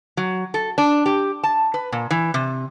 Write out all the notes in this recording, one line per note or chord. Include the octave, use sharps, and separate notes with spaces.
F#3
A4
D4
G4
A5
B4
A#2
E3
C3